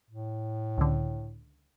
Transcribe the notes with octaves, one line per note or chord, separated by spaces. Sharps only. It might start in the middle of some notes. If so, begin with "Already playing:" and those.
A2
C#2 D3